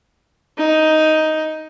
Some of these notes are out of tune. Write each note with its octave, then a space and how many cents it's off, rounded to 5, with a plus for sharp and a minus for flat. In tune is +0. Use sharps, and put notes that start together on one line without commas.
D#4 +10